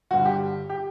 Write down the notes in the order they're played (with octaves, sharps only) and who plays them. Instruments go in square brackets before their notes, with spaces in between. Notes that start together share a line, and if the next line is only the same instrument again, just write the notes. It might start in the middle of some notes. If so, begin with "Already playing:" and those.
[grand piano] G1 G2 D3 F#4
G4
G4